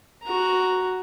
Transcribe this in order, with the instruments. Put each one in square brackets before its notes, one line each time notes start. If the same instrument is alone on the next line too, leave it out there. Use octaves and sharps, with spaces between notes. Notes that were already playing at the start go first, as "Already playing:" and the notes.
[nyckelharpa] F#4 A#5